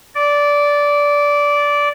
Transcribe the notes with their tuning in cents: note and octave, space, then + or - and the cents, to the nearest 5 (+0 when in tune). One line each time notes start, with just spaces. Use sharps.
D5 -15